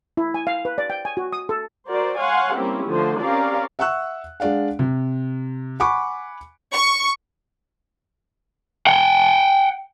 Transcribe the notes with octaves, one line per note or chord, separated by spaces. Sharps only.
E4
G#5
F5
B4
D5
G5
G#5
F#4
D#6
A4
F#4 A#4 C5 D5
C#5 F5 F#5 G#5 C6
G3 A#3 C4 C#4 E4 G4
D3 F3 A3 C5
C4 C#4 G4 A#4 D5 F5
E5 F#5 C#6 E6 F#6
G#3 D4 D5 F5 F#5
C3
F#5 G#5 B5 C#6 D6
C#6
F#5 G5